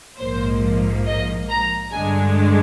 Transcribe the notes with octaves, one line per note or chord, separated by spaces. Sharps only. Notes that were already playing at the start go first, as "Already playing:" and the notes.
A#1 G#2 F3 A#3 C5
D#5
A#5
G2 D3 G#3 D4 G#5